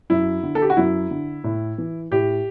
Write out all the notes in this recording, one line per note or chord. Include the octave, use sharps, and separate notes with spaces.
F#2 E4
D3
A4
G4
F#4
F#2 E4
D3
A2
E3
A2 G4